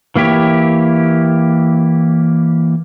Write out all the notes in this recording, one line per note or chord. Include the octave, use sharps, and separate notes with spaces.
E3 A#3 E4 G4 C#5